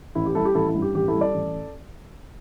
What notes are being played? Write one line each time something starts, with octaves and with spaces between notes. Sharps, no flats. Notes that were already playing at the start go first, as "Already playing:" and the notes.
A1 E4
G4
G3 E4 A4
G4
A1 E4 A4
E4
G2
G4
A1 G4
E4 A4
G3
A4 D5
A1